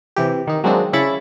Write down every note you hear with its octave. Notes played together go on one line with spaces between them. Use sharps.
C3 E3 G4
D#3 D#4
F#3 G#3 A#3 C4 D4 D#4
C#3 C#4 E4 B5 C#6 A6